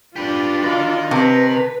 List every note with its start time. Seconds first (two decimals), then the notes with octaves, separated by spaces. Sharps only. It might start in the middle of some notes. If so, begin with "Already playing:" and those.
0.16 D4 F4 G4 B4
0.64 F#4 A#4 D#5 F5
1.11 C3 B4 A5 A#6